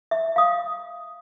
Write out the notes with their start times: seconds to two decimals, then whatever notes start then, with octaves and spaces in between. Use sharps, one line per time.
0.11 E5
0.36 F5 D#6